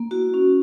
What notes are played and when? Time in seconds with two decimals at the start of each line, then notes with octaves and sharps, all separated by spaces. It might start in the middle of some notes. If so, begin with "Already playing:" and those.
Already playing: A#3
0.11 E4 F#4
0.34 C#4